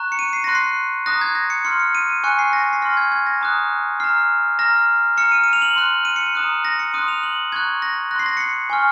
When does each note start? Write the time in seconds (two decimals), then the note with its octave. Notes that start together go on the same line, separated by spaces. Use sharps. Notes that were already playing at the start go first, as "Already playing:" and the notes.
Already playing: A#5 C#6 F#6
0.12 C#7
0.19 D#7
0.33 C7
0.44 C6 F#6 A#6
0.55 C7
1.06 A#5 D#6 F#6 A#6
1.21 G#6
1.35 A#6
1.50 C#7
1.65 C6 F6 C#7
1.80 C#7
1.95 D#7
2.10 D#7
2.23 G#5 C#6 F#6 C#7
2.39 C7
2.53 A#6
2.63 A#6
2.73 C7
2.82 C6 F6 A#6
2.97 G#6
3.12 G#6
3.26 A#6
3.41 A#5 D#6 F#6
4.00 A#5 F6 C7
4.59 A#5 F6 A#6
5.17 A#5 F6 C#7
5.32 D#7
5.44 D#7
5.53 F7
5.62 F#7
5.76 C6 F#6
6.05 D#7
6.16 C#7
6.26 D#7
6.35 A#5 D#6 F#6
6.65 A#6
6.79 C#7
6.93 C6 D#6 F#6 D#7
7.08 F7
7.23 F#7
7.52 A#5 C#6 F#6 G#6
7.82 A#6
8.11 F#6 A#6
8.15 C6 C7
8.26 A#6
8.37 C#7
8.40 C7
8.70 G#5 C#6 F6